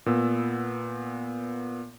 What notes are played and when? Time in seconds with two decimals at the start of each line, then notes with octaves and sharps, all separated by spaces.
0.06 A#2 B3 E6